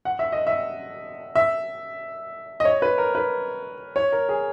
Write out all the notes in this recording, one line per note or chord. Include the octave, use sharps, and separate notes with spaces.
F#5
E5
D#5
E5
E5
D#5
C#5
B4
A#4
B4
C#5
A#4
G#4